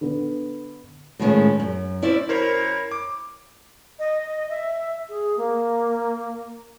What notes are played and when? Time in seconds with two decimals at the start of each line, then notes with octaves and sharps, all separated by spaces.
0.01 D3 B3
1.19 A2 D#3 F3 G#3 C#4
1.60 F#2
2.02 C#4 E4 C5 D5
2.29 F#2 E4 A#4 C5 C#5
2.92 D6
3.99 D#5
4.50 E5
5.09 G#4
5.37 A#3